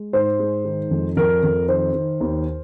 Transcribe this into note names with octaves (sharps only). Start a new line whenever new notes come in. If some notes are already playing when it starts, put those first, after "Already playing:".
Already playing: G#3
G#2 C5
G#3
D#3
F2
F2 A#4
F2
D#3 C5
D#3
D#2